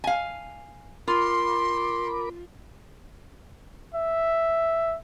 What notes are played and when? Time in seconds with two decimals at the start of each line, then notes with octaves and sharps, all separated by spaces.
0.04 F5 G#5
1.08 F4 A#4 B5 C6 D6
3.95 E5